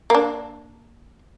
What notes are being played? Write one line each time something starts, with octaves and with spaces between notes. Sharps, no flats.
A#3 D4